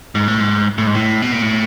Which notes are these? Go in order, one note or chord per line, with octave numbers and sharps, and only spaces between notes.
G#2
A2
G#2
A2
G#2
A2
B2
A#2
A2